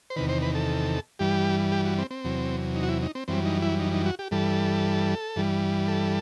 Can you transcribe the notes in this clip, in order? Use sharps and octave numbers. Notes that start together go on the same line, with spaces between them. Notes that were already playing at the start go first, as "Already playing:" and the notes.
C5
E2 C3 D#3 B4
C5
B4
A4
G2 E3 G3 G4
G4
F#4
C4
C4
E2 C3 F#3
D#4
F#4
E4
D#4
C4
F#2 E3 G3 C4
D#4
E4
D#4
D#4
F#4
G4
G2 E3 G3 A4
G2 E3 G3
A4